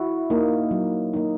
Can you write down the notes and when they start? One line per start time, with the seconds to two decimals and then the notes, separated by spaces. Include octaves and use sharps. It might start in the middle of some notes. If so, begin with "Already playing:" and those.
Already playing: E4 F#4
0.30 A#3 D#4
0.71 F#3
1.13 A#3 D#4